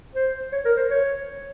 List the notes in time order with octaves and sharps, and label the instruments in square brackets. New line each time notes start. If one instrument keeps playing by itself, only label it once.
[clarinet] C5
C#5
A#4
C5
C#5